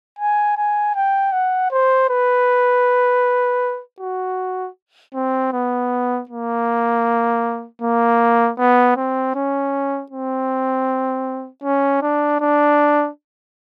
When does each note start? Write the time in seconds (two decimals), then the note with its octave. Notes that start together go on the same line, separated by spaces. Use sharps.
0.19 G#5
0.57 G#5
0.95 G5
1.32 F#5
1.71 C5
2.09 B4
4.00 F#4
5.14 C4
5.53 B3
6.29 A#3
7.82 A#3
8.58 B3
8.96 C4
9.35 C#4
10.11 C4
11.64 C#4
12.02 D4
12.40 D4